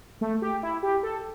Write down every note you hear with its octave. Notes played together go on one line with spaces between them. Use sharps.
A3
G4
E4
G4
A4